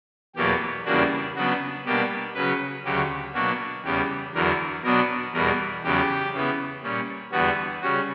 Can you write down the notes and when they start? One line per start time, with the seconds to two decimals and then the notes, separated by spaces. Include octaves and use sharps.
0.36 E2 B2 F#3 A#3 G4
0.85 E2 C#3 G3 A#3 D4 F#4
1.36 C#3 F#3 B3 D4 F#4
1.85 B2 G3 A#3 D4 G4
2.35 C#3 F#3 C#4 B4
2.85 D2 C#3 F#3 G4
3.34 B2 F#3 A#3 D4 F#4
3.84 E2 C#3 G3 G4
4.34 E2 D3 F#3 A#4
4.84 B2 F#3 B3 D4 A#4
5.33 E2 B2 G3 A#4
5.83 E2 C#3 F#3 G4
6.33 C#3 E3 B3
6.82 A#2 G3 C#4
7.32 E2 D3 G3 B3 F#4
7.82 C#3 G3 C#4 F#4